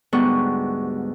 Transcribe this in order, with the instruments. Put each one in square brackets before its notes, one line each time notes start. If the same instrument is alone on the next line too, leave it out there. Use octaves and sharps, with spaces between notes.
[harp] D2 G#2 G3 B3 F#4 C#6